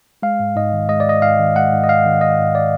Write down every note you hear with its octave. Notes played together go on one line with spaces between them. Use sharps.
G#3 F5
G#2
G#2 D#5
D#3
G#3 D#5
D5
G#2 D#5
G#2 F5
D#3
G#3 F#5
G#2
D#5
G#2 F5
D#3
G#3 D#5
G#2
D5